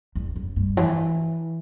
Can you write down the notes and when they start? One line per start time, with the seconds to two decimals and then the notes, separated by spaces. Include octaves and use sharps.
0.15 E2
0.36 F#2
0.56 G2
0.77 E3